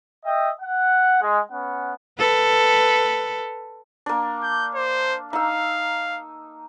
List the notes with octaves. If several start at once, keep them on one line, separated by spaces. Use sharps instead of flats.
D#5 E5 G5
F#5
G#3
B3 C#4 F#5
A4 B4
A#3 D4
G6
C5
D#4 F5 E6